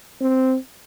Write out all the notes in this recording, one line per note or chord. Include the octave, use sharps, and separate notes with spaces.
C4